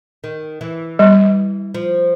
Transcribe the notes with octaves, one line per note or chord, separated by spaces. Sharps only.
D#3
E3
G3
F3